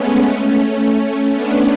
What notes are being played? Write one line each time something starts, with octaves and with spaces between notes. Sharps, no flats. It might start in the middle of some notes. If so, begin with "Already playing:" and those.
Already playing: G#3 A3 B3 C#4
A3 C#4
B3 D4